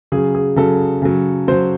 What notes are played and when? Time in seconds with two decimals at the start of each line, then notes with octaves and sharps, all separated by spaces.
0.12 C#3 F#3 G#4
0.35 G#4
0.56 C#3 F#3 A4
1.02 C#3 F#3
1.48 C#3 F#3 C5